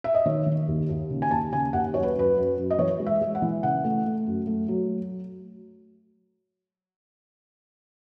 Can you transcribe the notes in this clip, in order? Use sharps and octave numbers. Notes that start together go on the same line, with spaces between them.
E5
D#5
D#3 C#5
D#3
D#2
D#2
C#3
G#5
D#2 A5
C#3 G#5
D#2 F#5
F#2 C#5
B4
F#2 B4
F#2
F#2
D#5
E3 C#5
G#3
E5
G#3
F#5
E3
C#3 F#5
A3
A3
F#2
A3
F#3